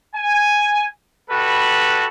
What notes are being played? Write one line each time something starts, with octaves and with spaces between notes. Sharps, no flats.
G#5
G3 F#4 A4 B4 B5